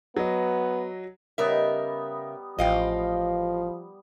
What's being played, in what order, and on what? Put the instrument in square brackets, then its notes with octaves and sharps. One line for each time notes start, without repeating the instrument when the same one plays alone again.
[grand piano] F#3 D#5 [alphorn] B3
[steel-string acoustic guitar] C#3 A#4 E5 [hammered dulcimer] G3 B3 D#4
[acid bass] A1 [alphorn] F3 [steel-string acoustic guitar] D#5 F5 G5